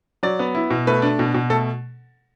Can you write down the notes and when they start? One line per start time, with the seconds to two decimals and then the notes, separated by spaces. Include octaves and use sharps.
0.23 F#3 D5
0.39 B3
0.55 E4
0.70 B2
0.87 A3 B4
1.02 D4
1.19 B2
1.34 B2
1.50 A3 A4